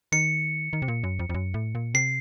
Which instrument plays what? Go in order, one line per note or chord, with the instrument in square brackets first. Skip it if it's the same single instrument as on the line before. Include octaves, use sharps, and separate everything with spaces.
[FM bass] D#3 [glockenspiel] C#7
[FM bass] D#3
C3
A#2
F#2
F2
F2
F#2
A2
A#2
[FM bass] C3 [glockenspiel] C7